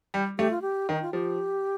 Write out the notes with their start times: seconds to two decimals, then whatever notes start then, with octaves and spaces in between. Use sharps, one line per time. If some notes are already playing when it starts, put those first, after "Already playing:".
0.14 G3
0.38 A3 G4
0.50 F4
0.62 G4
0.89 D#3 D#4
1.02 F4
1.13 F3 G4